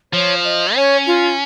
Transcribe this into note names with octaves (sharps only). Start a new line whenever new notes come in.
F3 C#5
D#5
C#4 C#5
F4